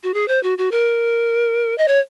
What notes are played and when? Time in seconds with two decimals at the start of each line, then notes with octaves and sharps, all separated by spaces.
0.03 F#4
0.14 G#4
0.28 C5
0.43 F#4
0.58 F#4
0.71 A#4
1.78 D#5
1.88 C#5